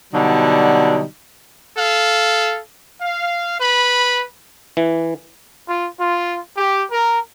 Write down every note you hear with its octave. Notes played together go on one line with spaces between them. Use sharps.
B2 D3 F#3 G3 D#4
A4 F5
F5
B4 B5
E3
F4
F4
G4
A#4